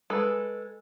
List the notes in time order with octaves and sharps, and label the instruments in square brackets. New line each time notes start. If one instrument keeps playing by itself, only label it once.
[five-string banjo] G#3 A4 B4